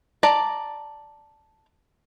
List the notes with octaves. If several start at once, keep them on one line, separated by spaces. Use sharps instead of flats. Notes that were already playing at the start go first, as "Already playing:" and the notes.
D5 A5 A#5